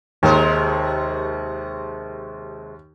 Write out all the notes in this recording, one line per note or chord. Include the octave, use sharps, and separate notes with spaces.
D#2 C3 G#3 A#4